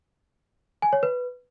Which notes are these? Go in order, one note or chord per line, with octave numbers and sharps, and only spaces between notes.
G#5
C#5
B4